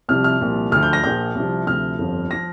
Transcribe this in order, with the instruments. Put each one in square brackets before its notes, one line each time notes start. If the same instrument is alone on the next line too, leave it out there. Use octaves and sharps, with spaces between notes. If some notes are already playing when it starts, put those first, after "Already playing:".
[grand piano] C2 C3 F3 F6
F6
C2 A#2 F3
D2 D3 F3 F6
G6
A#6
A#1 A#2 F3 G6
C2 C3 F3
D2 C3 F3 F6
G1 F2 F3
F3 A#6